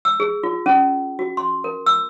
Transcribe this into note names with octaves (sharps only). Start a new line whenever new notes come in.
E6
G#4
F4
C#4
F#4
C6
A#4
E6